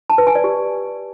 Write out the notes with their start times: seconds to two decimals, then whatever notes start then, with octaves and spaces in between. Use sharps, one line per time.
0.10 A5
0.18 B4
0.27 G#5
0.35 D5
0.44 G4